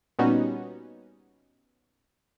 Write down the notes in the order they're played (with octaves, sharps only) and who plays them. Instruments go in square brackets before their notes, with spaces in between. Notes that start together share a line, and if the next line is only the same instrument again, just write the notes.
[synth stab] A#2 G3 B3 C#4 D#4 F#4